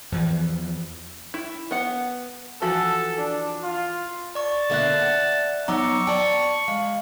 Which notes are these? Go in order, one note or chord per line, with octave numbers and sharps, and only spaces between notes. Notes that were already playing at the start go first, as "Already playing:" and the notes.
E2 E3 F3
E4
B3 F#5
E3 F3 F#4 A4
D4
F4
D5 A5 C#6
B2 D3 A#3 D5 E5 F#6
F#5
F#3 B3 D#4 A#5 C#6 D6 E6
D5 G5 A5
G#3 F5